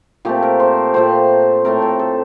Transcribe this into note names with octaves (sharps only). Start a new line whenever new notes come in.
A#2 A3 C4 G4
A#4
C5
A#2 A3 C4 C5
A2 A3 C4 A#4
A4
A4